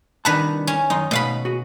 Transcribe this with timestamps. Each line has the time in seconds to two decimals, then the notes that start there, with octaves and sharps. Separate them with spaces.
0.25 C2 D#3 D4 B4 F#5 A5
0.67 C#4
0.90 F#2 D#3 D#4 C6
1.11 G#2 B2 A3 F5 B5
1.45 F#4 G#4